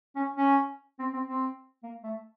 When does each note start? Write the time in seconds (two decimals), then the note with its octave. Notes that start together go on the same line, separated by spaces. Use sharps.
0.16 C#4
0.36 C#4
0.99 C4
1.13 C4
1.26 C4
1.83 A#3
2.03 A3